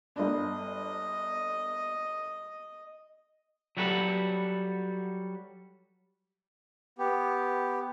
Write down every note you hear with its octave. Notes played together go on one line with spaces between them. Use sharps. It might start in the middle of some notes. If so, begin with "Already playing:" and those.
G1 D4 D#5
F#3 G3 F#4 A4 B4
B3 G4